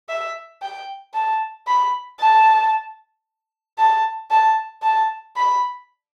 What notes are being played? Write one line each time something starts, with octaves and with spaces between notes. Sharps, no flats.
E5
G5
A5
B5
A5
A5
A5
A5
B5